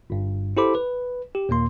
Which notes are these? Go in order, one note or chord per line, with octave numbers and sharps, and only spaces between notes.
G1 G2
E4 G4 A4 C5 B5 D6
B4
G4
D#2 A#2 A#3 C6